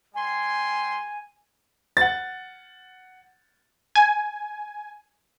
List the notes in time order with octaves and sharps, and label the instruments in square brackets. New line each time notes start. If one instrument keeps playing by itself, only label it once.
[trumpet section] G3 G5 C6 [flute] G#5
[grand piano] F#5 A6
[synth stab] G#5